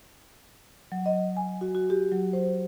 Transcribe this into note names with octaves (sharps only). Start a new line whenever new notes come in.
F#3
D#5
G#5
F#4
F#4
G4
F#3
C5